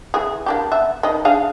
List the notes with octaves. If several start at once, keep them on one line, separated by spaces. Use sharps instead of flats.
E3 G#4
A#3 D4 G4
B3 E5
D#3 D#5
D4 G#4 F5